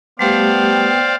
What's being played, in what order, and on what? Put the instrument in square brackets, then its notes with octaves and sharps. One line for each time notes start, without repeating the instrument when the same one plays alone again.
[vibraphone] G3 A3 G4 [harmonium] B3 [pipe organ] C5 D5 F5 [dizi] G5